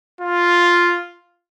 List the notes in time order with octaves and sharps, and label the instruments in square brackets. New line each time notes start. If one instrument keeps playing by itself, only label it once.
[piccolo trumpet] F4